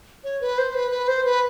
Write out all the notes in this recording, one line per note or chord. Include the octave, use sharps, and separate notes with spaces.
C#5
B4
C5
B4
B4
C5
B4